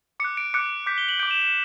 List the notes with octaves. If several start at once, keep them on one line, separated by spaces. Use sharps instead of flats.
D6 F#6 C#7
D7
D6 F#6 C#7
D6 G6 B6
G7
F#7
D6 G6 D7
E7
E7